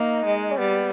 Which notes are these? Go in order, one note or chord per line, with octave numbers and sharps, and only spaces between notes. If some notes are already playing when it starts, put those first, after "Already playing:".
Already playing: A#3 D#4
G#3
C#4
G3 B3